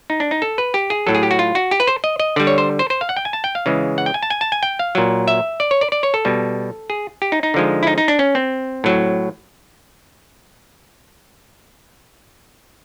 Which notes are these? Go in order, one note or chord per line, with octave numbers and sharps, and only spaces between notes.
D#4
D4
D#4
A4
B4
G4
G#4
A2 F#3 A4
G#4
G4
F#4
F4
F#4
G4
B4
C5
D#5
D#5
D3 G3 D5
C#5
C5
C5
C5
F5
F#5
G5
G#5
A5
G5
F5
C#3 E3 G#3
F#5
G5
G#5
A5
G#5
A5
G#5
G5
F5
A#2 F#3
E5
D5
C#5
D5
D5
C#5
A4
B2 G3
G#4
G4
D#4
D#4
D3 F3 G#3
E4
D#4
D#4
D4
C#4
C4
A2 F#3